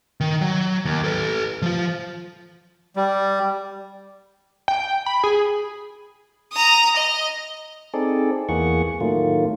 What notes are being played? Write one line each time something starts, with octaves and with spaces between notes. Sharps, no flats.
D#3
F#3
D#2
A4 B4
F3 F4
G3
G5
B5
G#4
A#5 D#6
D#5
C4 D#4 G#4 A4 D5
E2 E3 A#3 G#4 F#5 C#6
A2 D#3 F#3 A3 A#3 F4